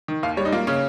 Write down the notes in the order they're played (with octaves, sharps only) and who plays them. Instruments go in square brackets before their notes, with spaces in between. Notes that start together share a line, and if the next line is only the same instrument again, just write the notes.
[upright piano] D#3
D#2 F5
G3 C#5
D#4
A#3 F4
C#3 C#4